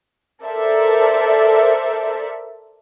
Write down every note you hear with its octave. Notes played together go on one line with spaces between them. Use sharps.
A4 A#4 C5 D5 E5